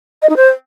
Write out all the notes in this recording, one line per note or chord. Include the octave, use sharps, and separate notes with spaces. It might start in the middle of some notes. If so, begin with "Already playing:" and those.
D#5
D#4
C5